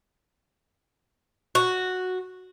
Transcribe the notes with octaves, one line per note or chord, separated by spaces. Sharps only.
F#4